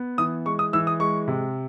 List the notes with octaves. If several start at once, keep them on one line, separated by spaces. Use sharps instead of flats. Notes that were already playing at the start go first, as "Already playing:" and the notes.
Already playing: B3
E3 D#6
G#3 C#6
D#6
E3 E6
D#6
G#3 C#6
C3